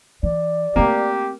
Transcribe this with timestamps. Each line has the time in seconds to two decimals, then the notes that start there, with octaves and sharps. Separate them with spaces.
0.23 E3 D5
0.76 A3 A#3 C4 G4